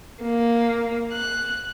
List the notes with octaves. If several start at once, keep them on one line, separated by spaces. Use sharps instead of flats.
A#3
F#6